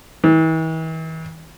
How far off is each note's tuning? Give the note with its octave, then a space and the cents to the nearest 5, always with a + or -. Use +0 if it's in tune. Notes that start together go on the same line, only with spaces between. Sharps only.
E3 -40